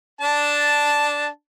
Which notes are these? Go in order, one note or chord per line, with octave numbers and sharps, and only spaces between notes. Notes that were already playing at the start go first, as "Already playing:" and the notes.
D4 A5